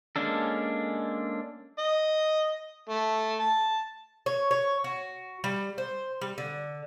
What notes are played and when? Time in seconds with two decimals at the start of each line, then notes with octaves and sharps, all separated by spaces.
0.16 G#3 A#3 C#4 D4 A4
1.78 D#5
2.89 A3
3.39 A5
4.26 C#5
4.51 C#5
4.84 F#4
5.44 G3
5.78 C5
6.21 G3
6.38 D3